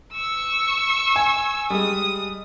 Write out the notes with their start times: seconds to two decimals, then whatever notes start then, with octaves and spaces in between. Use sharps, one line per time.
0.13 C#6 E6
1.16 G#5
1.70 G3 G#3 D#6